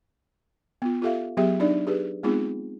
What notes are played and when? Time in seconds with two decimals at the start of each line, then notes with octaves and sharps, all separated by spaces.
0.82 B3 F4
1.02 F4 G4 A4 E5 F5
1.37 F#3 B3 G4 G#4 E5
1.60 D4 D#4 D5
1.87 G4 G#4 B4
2.23 G#3 B3 C4 D#4 F4 G#4